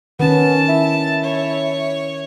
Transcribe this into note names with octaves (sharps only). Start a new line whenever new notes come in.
D#3 B3 C#4 A5
E4
C#5